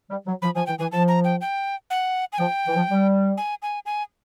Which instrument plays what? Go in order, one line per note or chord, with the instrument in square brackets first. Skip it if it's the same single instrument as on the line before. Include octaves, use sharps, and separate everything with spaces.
[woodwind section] G3
F#3
[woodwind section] F3 [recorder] B5
[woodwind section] F3 [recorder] G#5
[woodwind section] E3 [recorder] G5
[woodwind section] E3 [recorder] G#5
[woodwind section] F3 [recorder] A5
[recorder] A#5
G5
G5
F#5
G#5
[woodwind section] F3 [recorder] G5
[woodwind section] E3
F3
G3
[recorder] G#5
G#5
G#5